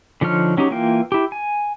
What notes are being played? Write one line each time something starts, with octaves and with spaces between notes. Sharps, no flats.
D3 F3 D#4 C#5 F6
F#3 C#4 D#4 G4
E3 A#3 F4 G5
E4 G4
G#5